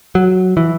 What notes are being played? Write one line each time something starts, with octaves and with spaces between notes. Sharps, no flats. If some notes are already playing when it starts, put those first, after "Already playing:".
F#3
E3